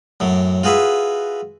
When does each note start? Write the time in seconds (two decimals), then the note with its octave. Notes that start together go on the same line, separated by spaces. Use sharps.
0.20 F#2 A2 F#3
0.63 F4 F#4 G#4 B4 E5